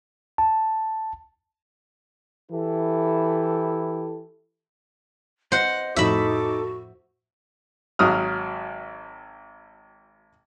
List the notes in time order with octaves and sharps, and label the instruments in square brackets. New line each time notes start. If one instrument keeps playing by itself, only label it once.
[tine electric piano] A5
[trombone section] E3 E4 G4 A4
[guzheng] C5 F#5 [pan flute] D#5 [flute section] F#6
[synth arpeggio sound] F2 A2 [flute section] D#4 A4 D6 [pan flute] F#4 [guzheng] E5 B5
[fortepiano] G#1 F#3 D#6 F6